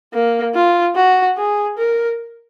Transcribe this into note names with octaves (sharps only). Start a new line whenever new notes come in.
A#3
F4
F#4
G#4
A#4